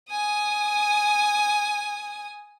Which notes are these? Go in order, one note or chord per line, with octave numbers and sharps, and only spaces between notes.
G#5 D#6